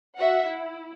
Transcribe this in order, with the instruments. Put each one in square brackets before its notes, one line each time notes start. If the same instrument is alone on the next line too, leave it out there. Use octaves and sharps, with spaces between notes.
[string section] F#4 E5 F#5
E4